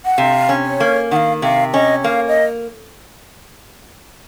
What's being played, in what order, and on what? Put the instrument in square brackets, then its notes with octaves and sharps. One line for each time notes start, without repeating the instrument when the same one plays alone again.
[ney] F#5
[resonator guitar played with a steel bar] C3 [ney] F5
[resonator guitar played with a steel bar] C#4
[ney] C#5
[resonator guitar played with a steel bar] A#3
[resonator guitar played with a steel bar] D#3 [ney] F#5
[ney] F5
[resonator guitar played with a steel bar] C3 [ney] F5
[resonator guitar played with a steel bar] C#4 [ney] D#5
[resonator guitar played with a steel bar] A#3 [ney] F5
[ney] D#5